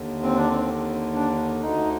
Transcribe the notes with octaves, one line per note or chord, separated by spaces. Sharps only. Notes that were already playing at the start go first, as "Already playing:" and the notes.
Already playing: D#2 D3
C4
D4
C4
D4
D2 D3 D#4